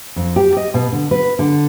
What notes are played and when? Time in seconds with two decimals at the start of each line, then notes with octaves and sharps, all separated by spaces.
0.16 F2
0.36 G4
0.57 D#5
0.74 B2
0.92 D3
1.11 B4
1.39 D3